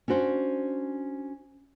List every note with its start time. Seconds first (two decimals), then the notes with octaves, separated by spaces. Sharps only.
0.08 C#4 D4 F#4 C5